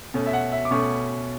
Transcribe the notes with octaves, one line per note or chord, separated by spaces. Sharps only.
B2 A3 C#4
E5
F#5
E5
D6
B2 A3 C#4 C#6